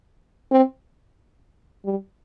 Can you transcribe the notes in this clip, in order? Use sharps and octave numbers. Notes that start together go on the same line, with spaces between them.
C4
G3